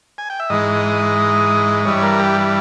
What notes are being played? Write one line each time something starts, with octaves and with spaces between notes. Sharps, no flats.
G#5
G5
E5
G#2 E3 G#3 D#5
G2 E3 G3 C#5
A#4
G4